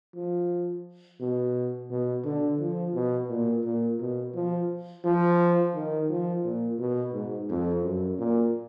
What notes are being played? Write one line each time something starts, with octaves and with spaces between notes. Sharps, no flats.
F3
B2
B2
D3
F3
B2
A#2
A#2
B2
F3
F3
D#3
F3
A#2
B2
G#2
F2
F#2
A#2